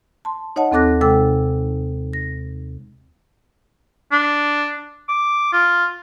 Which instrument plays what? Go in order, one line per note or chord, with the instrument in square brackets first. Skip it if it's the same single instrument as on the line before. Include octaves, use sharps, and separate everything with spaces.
[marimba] A5 C6
D#4 C#5 D#5 F#5 A5
D#2 C4 A4 D6 F#6 A#6
C3 G#3 A4 G5 D6 E6
A#6
[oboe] D4
D6
F4